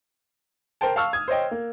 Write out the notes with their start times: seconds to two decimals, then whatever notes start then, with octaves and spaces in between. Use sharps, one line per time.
0.81 A#4 C5 G5 A5
0.96 F5 A5 C#6 E6 F6
1.13 D#6 G#6
1.28 C5 C#5 D#5 G5
1.51 A#3